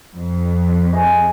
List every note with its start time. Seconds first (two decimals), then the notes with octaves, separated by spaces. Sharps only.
0.16 F2
0.93 G#4 D#5